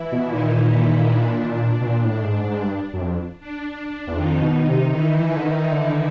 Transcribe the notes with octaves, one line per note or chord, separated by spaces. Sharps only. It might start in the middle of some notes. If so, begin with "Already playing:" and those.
Already playing: E3 E4
B2
A#2 D#3 D#4
D4
B2
A#2
A2
G#2
G#2
G2
F#2
F2
D4
E2
F2 D#3 D#4
B2
C3
D#3 E3 E4
E3
D3
D#3
D3